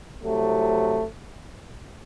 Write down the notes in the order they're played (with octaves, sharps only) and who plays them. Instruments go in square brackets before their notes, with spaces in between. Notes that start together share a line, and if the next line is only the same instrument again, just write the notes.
[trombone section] C2 C3 F#3 A3